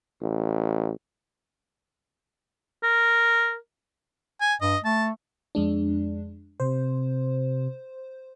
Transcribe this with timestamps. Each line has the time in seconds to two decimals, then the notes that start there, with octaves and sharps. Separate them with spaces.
0.22 A1
2.83 A#4
4.41 G#5
4.61 G2 D#5
4.85 A3 A5
5.55 F2 G#3 D4
6.60 C3 C5